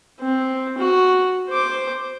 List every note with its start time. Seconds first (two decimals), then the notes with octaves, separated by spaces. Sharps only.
0.20 C4
0.78 F#4
1.49 C5 D6